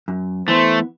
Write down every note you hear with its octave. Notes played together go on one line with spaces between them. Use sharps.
F#2
E3 A3 B3 C5